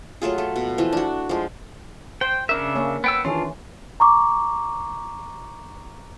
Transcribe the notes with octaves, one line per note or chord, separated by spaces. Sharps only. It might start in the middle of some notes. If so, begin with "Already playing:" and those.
F#3 A3 F4 G#4
A3
B2
E3 F3
D4 F#4
F3 G#3
C5 G5
C#3 D4 A#4 E5
A#3 C#4
B3 G5 E6
D#3 E3 C#4 D4 F4
A#5 C#6 D6